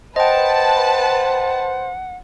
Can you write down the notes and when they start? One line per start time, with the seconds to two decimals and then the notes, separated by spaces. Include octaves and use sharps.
0.16 B4 C5 D#5 F#5 G5 A5